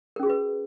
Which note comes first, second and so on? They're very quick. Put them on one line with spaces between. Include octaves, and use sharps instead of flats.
A#4 C#4 G#4 F#4 B4